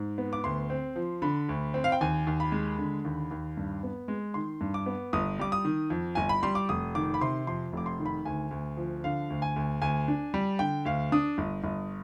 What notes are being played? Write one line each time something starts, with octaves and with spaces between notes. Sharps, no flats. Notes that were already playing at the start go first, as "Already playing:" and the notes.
Already playing: G#2
B3
D6
D2 C6
C4
F3
D3 B5
D2
C4
F5
G5
D#2 G#5
D#2
B5
G#3
D3
D#2
D#2
G2
B3
G#3
D#3 C6
G2
D6
B3
G1 D#6
G3 D6
D#6
D#3
F2
G1 G#5
B5
G3 C6
D6
F1 D#6
D#3 D6
B5
C3 C6
F2 C6
F1 D6
C6
D#3
B5
D2 G#5
D2
F3
D3 F5
D2
G#5
D2
D2 G#5
D4
G3
D3 G5
D2 F5
D4 D#6
G1
G1